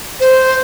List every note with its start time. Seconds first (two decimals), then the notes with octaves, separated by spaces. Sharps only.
0.20 C5